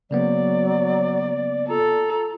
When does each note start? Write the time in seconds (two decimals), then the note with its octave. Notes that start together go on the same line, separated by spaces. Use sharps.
0.11 C#3 F#3 A#3 B3 D5
1.68 F4 A4 A#5